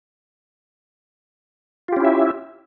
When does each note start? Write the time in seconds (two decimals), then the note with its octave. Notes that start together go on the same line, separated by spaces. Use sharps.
1.88 F4
1.92 G4
1.96 C#4
2.01 E4
2.05 E5